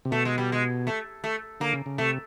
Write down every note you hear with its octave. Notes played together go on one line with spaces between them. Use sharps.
C3
B2 A3
G#3
G3
G#3
A3
A3
D3 A#3
C#3
C#3
C3 A3